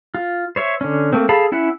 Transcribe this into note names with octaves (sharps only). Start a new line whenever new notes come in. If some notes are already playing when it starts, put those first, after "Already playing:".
F4
C5 C#5 E5
D3 C#4
A3 A#3 C4
G#4 A4 F5 A5 B5
C#4 E4 E5 F#5